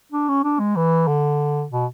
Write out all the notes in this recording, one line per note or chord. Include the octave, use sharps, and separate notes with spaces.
D4
C#4
D4
G#3
E3
D3
B2